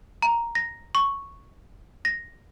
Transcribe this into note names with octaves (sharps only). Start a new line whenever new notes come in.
A#5
A#6
C#6
A#6